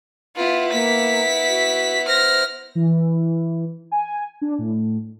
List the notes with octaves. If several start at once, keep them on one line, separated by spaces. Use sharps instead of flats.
B3 E4 F4
A#3 B6
F#4
C5 F6 A#6
E3
G#5
D4
A2